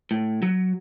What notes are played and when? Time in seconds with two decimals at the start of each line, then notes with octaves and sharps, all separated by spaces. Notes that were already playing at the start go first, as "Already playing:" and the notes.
0.11 A2
0.43 F#3